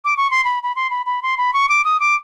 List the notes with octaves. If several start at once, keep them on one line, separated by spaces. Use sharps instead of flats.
D6
C#6
C6
B5
B5
C6
B5
B5
C6
B5
C#6
D6
D#6
D6